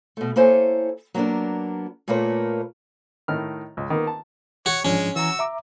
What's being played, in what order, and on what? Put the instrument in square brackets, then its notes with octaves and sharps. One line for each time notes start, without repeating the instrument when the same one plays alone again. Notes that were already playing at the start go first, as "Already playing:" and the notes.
[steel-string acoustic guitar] B2 A3
A#3 E4 A4 C5 C#5 G#5
F#3 A#3 B3 D4 A#4
A#2 A3 A#3 A#4 B4 C#5
[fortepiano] A2 D#3 F6
C#2
D#3 A#3 B3
A5
[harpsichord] F#4 [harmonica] C#5
[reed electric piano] G#2 F3 D4 [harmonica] G#3 [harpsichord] C#4
[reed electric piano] E3 G#5 A#5 [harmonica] F#4 E6
[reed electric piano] E5 A#5 D6